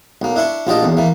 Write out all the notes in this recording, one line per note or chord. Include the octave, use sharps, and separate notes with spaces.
B1 A#3
D4 E4 C6 C#6
A#1 F4 G4 D5 D#5 A5
B1 E2
E3 A#3